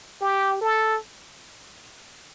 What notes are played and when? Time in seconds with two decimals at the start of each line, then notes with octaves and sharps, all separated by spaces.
0.21 G4
0.61 A4